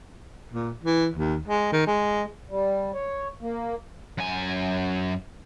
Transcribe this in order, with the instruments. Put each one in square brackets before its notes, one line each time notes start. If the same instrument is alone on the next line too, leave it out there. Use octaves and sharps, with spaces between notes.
[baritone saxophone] A#2
E3
D#2
G#3
D#3
G#3
[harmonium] G3
C#5
A#3
[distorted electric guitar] F#2 G#5